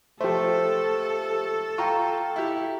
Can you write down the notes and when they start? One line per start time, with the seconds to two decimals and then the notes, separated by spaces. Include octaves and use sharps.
0.21 F3 A3 G4 A4 C5
1.78 F4 G5 A#5 C#6
2.36 E4 G4